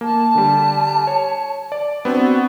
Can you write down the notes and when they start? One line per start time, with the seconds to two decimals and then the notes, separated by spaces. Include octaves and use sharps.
0.01 A#3 A5
0.35 D3 G3
1.07 C#5
1.72 D5
2.05 B3 C4 D4 F#4